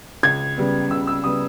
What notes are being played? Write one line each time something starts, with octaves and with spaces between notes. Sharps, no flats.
C#2 G#6
C#3 G3 B3
C#2 E6
E6
C#3 G3 B3 D#6